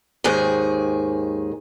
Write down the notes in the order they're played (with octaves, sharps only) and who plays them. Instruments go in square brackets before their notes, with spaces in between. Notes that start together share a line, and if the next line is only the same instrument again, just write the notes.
[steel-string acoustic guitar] D#2 G#2 D#3 G#4